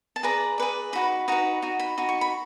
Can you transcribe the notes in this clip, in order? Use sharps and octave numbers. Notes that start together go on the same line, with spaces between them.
A5
G#4 B4 D5 A#5
G#4 B4 D5
D#4 F#4 B4 B5
D#4 F#4 B4 A#5
D#4 F#4
B5
D#4 F#4
C#6
B5